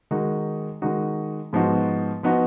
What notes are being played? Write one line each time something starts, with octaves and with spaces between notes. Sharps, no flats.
D#3 G#3 D#4 F#4
D#3 G#3 D#4 F#4
G#2 F3 B3 D#4 F#4
F3 B3 D#4 F#4